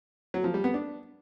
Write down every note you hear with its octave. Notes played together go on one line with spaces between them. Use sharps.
F#3
F3
G3
B3
D4